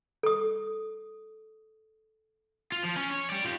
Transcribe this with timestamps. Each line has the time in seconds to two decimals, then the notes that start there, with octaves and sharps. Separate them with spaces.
0.23 A4 D#6
2.72 F4
2.84 F3
2.97 C#4
3.11 C#5
3.30 D5 G5
3.44 F4 G4